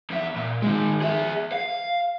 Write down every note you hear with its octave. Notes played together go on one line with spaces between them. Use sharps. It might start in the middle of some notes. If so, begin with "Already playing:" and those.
E2 E5
A#2
D#3 G#3
G#4 E5
F5